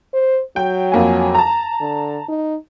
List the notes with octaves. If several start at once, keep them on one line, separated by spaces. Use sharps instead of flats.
C5
F#3 G5
F2 A#3 G#5
A5 A#5
D3
D#4